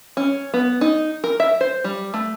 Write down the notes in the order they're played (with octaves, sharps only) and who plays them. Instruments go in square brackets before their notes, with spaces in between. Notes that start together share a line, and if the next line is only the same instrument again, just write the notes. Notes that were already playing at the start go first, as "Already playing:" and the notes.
[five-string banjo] C#4
B3
D#4
A#4
E5
C5
G3
A3